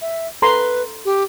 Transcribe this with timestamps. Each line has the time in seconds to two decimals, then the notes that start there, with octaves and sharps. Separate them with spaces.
0.02 E5
0.42 A4 B4 A#5 C6
1.05 G4